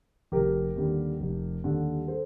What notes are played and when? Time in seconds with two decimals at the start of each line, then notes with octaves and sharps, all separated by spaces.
0.32 F1 G4 A#4
0.76 D#2 D3 G3
1.21 F1
1.64 D#2 D3 G3
2.08 A4 C5